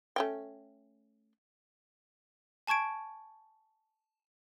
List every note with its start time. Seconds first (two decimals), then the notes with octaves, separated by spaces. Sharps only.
0.16 A3 C#4 G5
2.67 G#5 A5 C#6 G#6 D7